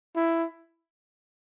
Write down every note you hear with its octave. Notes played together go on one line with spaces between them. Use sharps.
E4